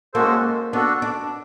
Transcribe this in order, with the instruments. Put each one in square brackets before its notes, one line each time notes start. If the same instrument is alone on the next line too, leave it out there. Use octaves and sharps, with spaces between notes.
[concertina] G#3 C#4 F#4 A4 C5 [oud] A#3
[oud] B3 [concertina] D4 F#4 A4
[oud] D4